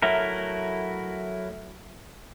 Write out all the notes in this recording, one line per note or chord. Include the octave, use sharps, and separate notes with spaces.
F#3 A3 E4 A#4